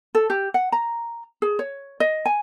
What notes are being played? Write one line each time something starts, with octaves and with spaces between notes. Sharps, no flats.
A4
G4
F#5
A#5
G#4
C#5
D#5
G#5